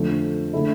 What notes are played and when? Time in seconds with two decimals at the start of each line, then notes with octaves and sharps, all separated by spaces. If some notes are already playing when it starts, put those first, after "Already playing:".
Already playing: F2 D3 A3
0.53 D3 A3 E4